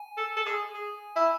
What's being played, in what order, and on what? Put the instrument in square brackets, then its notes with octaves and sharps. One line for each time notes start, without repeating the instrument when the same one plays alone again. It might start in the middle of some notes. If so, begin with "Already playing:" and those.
Already playing: [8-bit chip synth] G#5
[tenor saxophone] A4
A4
G#4
G#4
E4